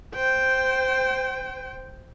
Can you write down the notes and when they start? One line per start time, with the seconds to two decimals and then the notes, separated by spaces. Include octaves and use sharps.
0.14 C5 G5